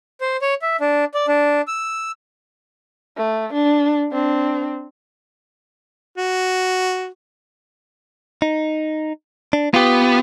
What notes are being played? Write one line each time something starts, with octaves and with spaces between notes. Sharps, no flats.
C5
C#5
E5
D4
D5
D4
E6
A3
D4
C4 D4
F#4
D#4
D4
B3 F4 G4